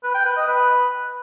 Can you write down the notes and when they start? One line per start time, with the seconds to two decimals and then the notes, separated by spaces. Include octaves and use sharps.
0.03 B4
0.14 G5
0.25 B4
0.36 D#5
0.47 B4